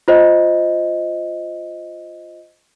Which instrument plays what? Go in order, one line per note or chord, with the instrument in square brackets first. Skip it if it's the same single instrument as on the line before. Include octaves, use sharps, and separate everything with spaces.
[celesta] F4 C5 D#5